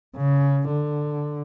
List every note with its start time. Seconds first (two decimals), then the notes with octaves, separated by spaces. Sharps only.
0.17 C#3
0.68 D3